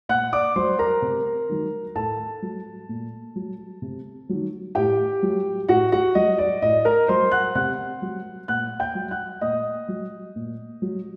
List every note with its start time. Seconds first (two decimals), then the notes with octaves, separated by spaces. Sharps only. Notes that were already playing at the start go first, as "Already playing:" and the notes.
0.09 A#2 F#5 F#6
0.33 D5 D6
0.56 F#3 C5 C6
0.79 A#4 A#5
1.02 C3
1.49 D#3 F#3
1.95 A2 A4 A5
2.42 F#3
2.89 A#2
3.36 F#3
3.82 C3
4.29 D#3 F#3
4.75 A2 G4 G5
5.23 F#3
5.69 A2 F#4 F#5
5.92 F#4 F#5
6.15 F#3 D#5
6.38 D5
6.62 A2 D#5
6.85 A#4 A#5
7.08 F#3 C5 C6
7.31 F#5 F#6
7.55 C3 F#5 F#6
8.02 F#3
8.48 A#2 F#5 F#6
8.80 G5 G6
8.95 F#3
9.11 F#5 F#6
9.41 A#2 D#5 D#6
9.88 F#3
10.36 A#2
10.82 F#3